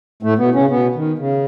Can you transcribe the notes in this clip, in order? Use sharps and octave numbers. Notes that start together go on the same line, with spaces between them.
A2 A3
B2 B3
C#3 C#4
B2 B3
D#3
C#3